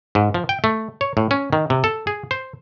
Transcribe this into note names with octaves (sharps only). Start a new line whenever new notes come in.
G#2
F3
G5
A3
C#5
A2
C#4
D#3
C3
A4
G#4
C5